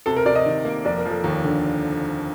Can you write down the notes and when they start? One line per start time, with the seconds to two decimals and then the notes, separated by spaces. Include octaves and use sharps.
0.06 C3 A4
0.16 A#4
0.26 C3 D5
0.36 D#5
0.46 D#3
0.65 A#3
0.85 F1 D5
0.98 A#4
1.05 F3
1.11 A4
1.24 D#2
1.44 D3